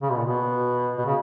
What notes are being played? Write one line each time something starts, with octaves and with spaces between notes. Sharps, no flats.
C#3
B2
A#2
B2
B2
C#3